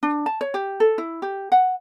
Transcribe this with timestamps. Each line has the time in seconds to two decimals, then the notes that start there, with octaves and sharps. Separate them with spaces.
0.03 D4
0.26 A5
0.41 C#5
0.54 G4
0.80 A4
0.98 E4
1.22 G4
1.52 F#5